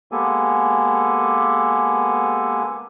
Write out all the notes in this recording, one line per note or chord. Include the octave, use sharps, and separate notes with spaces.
G#3 A#3 B3 G4 A4 G#5